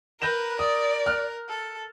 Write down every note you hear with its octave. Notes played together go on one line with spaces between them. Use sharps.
A#4 B4 G6 A#6 E7
D5 D#6
F6 F#6
A4